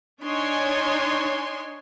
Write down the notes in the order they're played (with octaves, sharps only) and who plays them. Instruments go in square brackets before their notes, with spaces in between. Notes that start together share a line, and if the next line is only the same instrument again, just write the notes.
[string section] D4 D#4 C#5 G#5 C6